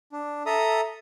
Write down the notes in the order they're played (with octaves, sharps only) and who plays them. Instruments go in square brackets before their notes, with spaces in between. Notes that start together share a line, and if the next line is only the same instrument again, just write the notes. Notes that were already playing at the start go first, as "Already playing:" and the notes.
[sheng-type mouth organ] D4
A4 E5 A#5 D#6